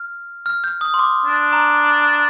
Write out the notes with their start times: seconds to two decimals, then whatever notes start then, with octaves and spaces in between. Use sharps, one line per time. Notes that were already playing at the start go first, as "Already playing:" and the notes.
Already playing: F6
0.46 F6
0.64 G6
0.81 D#6
0.94 C6
0.99 D6
1.26 D4
1.53 A#5